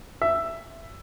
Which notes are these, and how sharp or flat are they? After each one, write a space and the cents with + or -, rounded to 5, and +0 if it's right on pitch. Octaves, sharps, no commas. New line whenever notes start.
E5 +10